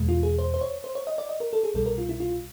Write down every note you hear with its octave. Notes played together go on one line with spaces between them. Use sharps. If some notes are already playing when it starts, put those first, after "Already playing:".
Already playing: E2 B2 G#3
F4
G#4
C5
C5
C#5
C5
C#5
D#5
D5
D#5
A#4
A4
G#4
C2 B2 G3 A4
A#4
F4
E4
F4